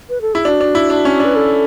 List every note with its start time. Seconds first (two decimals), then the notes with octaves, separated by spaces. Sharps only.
0.09 B4
0.21 A4
0.34 E4 G#4
0.45 D4 F#4
0.61 D4
0.75 E4
0.90 D4
1.05 C#4
1.20 D4 B4
1.36 A4